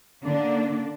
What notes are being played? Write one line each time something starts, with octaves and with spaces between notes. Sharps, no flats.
D3 A#3 D4